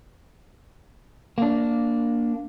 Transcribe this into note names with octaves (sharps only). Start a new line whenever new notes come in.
A#3 D4